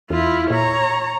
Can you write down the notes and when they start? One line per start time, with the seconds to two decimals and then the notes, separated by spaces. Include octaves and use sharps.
0.10 E2 E4 F4
0.50 A#2 C#5 A#5